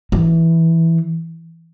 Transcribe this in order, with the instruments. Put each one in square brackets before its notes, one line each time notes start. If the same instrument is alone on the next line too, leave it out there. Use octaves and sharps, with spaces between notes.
[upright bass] E3